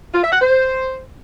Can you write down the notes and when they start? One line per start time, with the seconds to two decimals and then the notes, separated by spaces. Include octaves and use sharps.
0.14 F4
0.23 E5
0.32 F#5
0.41 C5